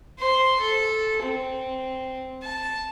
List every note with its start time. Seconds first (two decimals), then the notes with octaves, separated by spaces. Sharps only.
0.19 C5 C6
0.59 A4
1.22 C4
2.43 A5